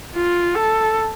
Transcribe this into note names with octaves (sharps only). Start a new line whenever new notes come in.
F4
A4